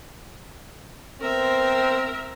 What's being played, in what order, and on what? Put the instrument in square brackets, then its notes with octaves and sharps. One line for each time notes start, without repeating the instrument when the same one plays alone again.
[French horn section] B3 C4 [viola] A#4 E5